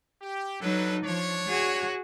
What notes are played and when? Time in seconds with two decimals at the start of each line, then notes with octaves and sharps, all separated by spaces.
0.22 G4
0.60 F#3 D4 D#4 A4 B4
1.04 F3 D4 C#5
1.48 F#4 G#4